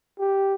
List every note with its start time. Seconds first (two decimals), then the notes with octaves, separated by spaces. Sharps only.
0.19 G4